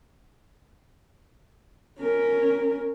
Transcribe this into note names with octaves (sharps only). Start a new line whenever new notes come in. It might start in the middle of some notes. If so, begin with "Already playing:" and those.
C#4 A#4